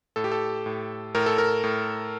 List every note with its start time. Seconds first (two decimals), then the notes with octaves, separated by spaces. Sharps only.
0.16 A2 A4
0.24 G4
0.32 A4
0.66 A2
1.15 A2 A#4
1.26 A4
1.38 A#4
1.64 A2